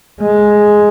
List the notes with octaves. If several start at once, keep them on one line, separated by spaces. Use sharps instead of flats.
G#3